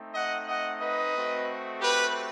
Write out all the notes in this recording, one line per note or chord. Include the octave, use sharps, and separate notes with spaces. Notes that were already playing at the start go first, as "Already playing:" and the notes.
Already playing: A3 C4 D#4
D#5 F#5
D#5 F#5
B4 D#5
A3 C4 F#4
G4 B4